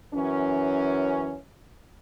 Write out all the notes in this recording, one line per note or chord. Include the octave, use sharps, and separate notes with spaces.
F#2 E3 C#4